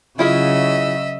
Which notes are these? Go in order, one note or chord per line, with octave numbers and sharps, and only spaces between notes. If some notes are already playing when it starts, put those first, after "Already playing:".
C#3 F#3 E4 F4 G#4 D#5 E5